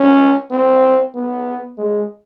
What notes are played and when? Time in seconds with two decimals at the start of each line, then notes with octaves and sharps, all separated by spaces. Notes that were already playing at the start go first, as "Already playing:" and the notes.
Already playing: C#4
0.51 C4
1.15 B3
1.77 G#3